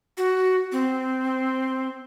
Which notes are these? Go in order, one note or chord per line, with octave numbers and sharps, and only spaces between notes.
F#4
C4